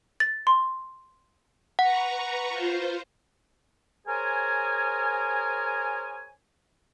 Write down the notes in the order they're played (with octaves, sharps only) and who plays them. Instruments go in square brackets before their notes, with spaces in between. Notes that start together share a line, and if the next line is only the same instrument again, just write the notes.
[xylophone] A6
C6
[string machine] B4 A#5 C#6 [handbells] F#5
[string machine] F4 C5
[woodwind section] G#4 A#4 C5 C#5 G#5